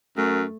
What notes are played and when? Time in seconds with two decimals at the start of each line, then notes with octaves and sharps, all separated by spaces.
0.17 F#2 A3